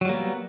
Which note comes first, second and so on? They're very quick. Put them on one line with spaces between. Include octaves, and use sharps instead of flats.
F#3 G3 A#3 B3